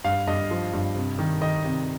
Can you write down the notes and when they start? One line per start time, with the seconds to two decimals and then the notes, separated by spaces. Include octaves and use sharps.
0.04 G2 F5
0.27 G2 D#5
0.51 F3
0.73 G2
0.96 C3
1.19 D#3
1.42 D#3 D#5
1.64 C3